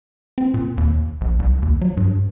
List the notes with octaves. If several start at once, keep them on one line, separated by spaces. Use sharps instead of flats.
C4
A#2
D#2
A#1
C2
D#2
F#3
G2